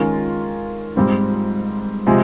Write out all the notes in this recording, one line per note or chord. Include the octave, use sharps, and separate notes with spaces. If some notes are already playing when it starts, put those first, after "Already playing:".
Already playing: D#3 G#3 C#4 F4 A#4
G#2 G3 C4 F4
C3 F3 G#3